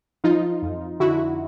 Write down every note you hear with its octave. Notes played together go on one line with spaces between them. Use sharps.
F3 D#4 F4
F2
D3 E4 F#4